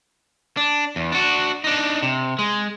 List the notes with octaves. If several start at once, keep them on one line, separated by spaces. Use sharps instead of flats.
D4
E2
D4 F#4
D4 D#4
C3
G#3